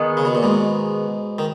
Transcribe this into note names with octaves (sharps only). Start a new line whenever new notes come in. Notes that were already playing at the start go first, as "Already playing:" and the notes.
Already playing: D#3 G#3 B3
C#3
B2
A#2
G#2 B2
D#3